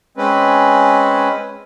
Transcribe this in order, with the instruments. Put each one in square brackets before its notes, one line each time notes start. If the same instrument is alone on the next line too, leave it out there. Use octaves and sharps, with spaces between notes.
[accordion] G#3 C4 C#4 B4